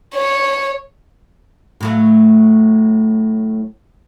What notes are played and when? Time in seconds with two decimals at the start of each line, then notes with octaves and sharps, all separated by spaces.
0.15 C#5
1.81 A2 F#3 A3